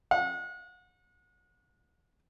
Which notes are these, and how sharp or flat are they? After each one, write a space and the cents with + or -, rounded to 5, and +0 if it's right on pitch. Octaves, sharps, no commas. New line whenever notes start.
F#5 -35